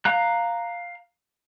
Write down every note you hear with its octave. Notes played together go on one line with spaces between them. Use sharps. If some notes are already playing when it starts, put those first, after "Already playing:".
F5 A#5 F#6